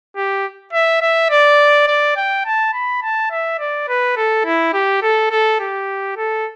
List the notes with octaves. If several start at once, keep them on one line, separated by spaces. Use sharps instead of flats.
G4
E5
E5
D5
D5
G5
A5
B5
A5
E5
D5
B4
A4
E4
G4
A4
A4
G4
A4